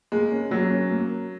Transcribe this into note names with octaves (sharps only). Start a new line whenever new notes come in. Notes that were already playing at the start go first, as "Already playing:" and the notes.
G#3 A#3
C#4
F#3 A#3
C#4
A#3